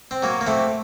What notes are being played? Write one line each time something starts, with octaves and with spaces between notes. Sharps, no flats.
C4
F#3 A#3
A#3
A3 C4